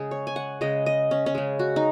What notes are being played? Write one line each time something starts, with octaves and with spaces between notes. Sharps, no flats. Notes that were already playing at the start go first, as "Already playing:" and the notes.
Already playing: C#3 G#3 G#4
C#5
G#5
F#5
C#3 G#3 D#5
D#5
C#4
C#4
C#3 G#3
F#4
D#4